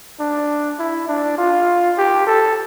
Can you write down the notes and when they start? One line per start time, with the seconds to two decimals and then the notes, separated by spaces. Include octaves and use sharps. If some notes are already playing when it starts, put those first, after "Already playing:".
0.20 D4
0.79 E4
1.08 D4
1.38 F4
1.98 G4
2.27 A4